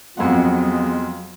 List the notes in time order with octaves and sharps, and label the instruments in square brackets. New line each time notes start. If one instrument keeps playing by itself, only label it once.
[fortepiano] F2 F#5 [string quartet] F#3 [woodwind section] G#3 B3 [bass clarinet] F4